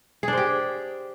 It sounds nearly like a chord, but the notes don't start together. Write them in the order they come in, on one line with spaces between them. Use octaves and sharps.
G#4 D4 C5 G4